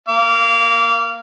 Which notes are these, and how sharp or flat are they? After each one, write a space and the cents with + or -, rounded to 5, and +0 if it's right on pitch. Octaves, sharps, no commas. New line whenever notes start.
A#3 +0 F5 -20 D6 -30